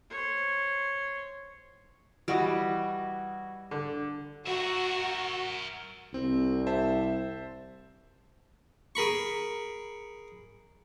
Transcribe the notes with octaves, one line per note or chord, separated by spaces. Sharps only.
C5 C#5
E3 G3 F#4 D#5
D3
F#4 A#4 E5
C2 C4
C5 E5 A5
G#4 A#4 B5 C#6